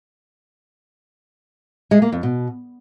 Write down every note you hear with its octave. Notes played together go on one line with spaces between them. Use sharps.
G#3
A#3
F2
B2